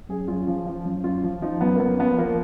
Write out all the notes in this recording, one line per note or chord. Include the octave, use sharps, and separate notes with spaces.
F#2 G#4
F#2 F4
F3
F3
F#2
F#2 F4
F3
F3 D#4
F#2 B3
A#3
F#2 B3
F3 B3
F3 A#3